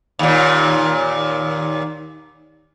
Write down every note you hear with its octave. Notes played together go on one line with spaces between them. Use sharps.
D#2 A#2